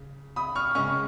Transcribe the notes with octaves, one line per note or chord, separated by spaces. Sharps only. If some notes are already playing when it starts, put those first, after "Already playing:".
Already playing: C#3
B5 D#6
C#6 F6
C#3 G#3 C#4 C#6 F6